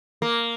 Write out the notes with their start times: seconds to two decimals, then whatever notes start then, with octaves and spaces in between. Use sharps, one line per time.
0.22 A#3